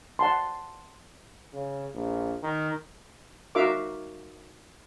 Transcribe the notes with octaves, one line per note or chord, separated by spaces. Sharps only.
F#5 A5 C6
C#3
A#1
D#3
D#4 F#4 A#4 E5 F5 D6